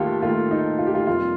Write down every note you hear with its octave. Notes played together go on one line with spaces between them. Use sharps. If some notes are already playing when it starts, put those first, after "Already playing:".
Already playing: D#2 D#3 A3 F4 G4 A4
D#2 D#3 A3 F4
D#4
F4
G4
F4
F2 C3 G3 A#3 F4